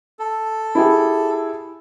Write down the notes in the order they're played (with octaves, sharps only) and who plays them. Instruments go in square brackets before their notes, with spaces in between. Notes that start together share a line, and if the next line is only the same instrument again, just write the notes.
[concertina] A4
[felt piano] E4 G4 G#4